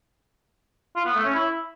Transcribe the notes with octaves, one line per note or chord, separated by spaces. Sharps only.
F4
B3
A3
C#4
E4